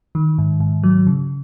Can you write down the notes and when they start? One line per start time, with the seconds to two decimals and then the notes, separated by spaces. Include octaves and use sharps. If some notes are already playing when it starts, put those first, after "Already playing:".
0.15 D#3
0.38 G#2
0.60 G#2
0.83 F#3
1.07 C#3